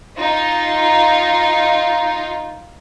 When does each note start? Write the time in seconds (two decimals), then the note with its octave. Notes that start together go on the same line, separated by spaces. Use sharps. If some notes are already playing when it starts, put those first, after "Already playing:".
0.17 D#4 F4